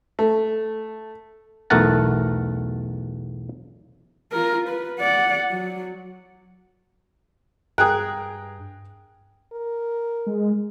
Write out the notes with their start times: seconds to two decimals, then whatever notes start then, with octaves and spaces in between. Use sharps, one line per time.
0.19 A3
1.70 B1 E2 A3 A#4 F#5 A5
4.32 F4 A#4
4.69 B4
4.99 D5 F#5
5.51 F#3
7.78 G2 G#4 A#4 G5 D#6 F#6
9.53 A#4
10.27 G#3